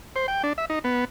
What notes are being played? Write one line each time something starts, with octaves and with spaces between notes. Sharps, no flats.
C5
G5
D4
E5
D#4
B3